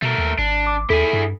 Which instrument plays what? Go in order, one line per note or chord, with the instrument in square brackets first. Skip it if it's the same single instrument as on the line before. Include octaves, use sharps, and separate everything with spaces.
[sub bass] B2 [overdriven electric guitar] A3 A#4
[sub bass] D#2
[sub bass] G#1 [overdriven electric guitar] D4
[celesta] D6
[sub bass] D#2 [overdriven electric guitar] E4 G#4 [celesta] A4
[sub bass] G2